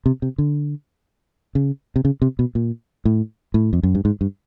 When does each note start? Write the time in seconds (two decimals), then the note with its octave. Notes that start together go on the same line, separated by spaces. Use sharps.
0.06 C3
0.22 C3
0.38 D3
1.55 C#3
1.96 C3
2.05 C#3
2.22 C3
2.39 B2
2.55 A#2
3.05 A2
3.54 A2
3.73 F2
3.83 F#2
3.95 G2
4.05 G#2
4.21 G2